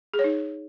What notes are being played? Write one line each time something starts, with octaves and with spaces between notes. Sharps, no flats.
G#4
C#5
D#4